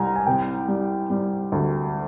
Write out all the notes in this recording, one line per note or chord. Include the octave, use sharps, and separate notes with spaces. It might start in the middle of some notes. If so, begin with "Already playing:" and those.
Already playing: C2 G3 G#5 A#5
G#5
C3 G5
G3
G3
D2